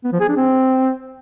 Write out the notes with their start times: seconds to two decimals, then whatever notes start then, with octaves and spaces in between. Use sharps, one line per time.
0.04 B3
0.12 F3
0.20 G#4
0.28 D4
0.37 C4